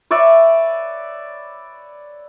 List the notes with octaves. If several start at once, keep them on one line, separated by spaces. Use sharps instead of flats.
B4 C#5 D5 E5